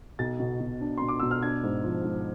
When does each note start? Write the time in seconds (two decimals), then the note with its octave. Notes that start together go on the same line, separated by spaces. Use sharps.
0.19 B1 A6
0.40 B2
0.60 B2
0.81 D4
0.98 B2 C6
1.08 D6
1.20 B2 E6
1.31 F6
1.42 D4 G#6
1.63 G#2
1.84 F3
2.04 G#2